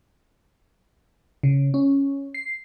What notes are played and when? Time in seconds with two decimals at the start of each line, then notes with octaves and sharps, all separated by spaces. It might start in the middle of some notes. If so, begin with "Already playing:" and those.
1.43 C#3
1.74 C#4
2.34 C7